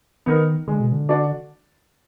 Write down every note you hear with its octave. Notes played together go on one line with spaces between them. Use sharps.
D#3 B3 D#4 A#4
D3 G#3
B2
D3
D4 F#4 D5